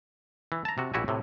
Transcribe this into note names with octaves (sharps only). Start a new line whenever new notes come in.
E3
A5 A#5
C3 F#4
A#1 E4 F#4 G4 G#5
A2 C3